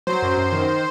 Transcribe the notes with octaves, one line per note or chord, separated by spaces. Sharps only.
F#3 C5
F#2
F#2
D#3